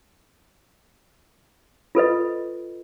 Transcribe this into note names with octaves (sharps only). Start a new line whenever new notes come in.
F4 A4 B4 D#5